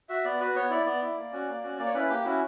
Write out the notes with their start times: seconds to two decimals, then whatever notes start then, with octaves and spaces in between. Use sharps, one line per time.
0.09 F#4 E5
0.25 B3 D5
0.40 F#4 B4
0.55 B3 C#5
0.70 E4 D5
0.86 B3 D5
1.02 E4
1.17 A#3
1.32 C#4 F#4
1.48 A#3
1.63 C#4 F#4
1.79 A#3 D5
1.86 C#5
1.94 C#4 E4 B4
2.10 A#3 G4
2.25 C#4 E4 F#4